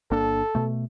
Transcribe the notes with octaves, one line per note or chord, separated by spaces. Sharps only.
G1 A#3 D4 A4
B2 A3